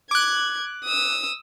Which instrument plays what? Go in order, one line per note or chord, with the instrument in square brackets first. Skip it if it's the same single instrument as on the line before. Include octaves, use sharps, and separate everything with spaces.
[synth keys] D6 F#6 [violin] G#6
[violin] D#6 E6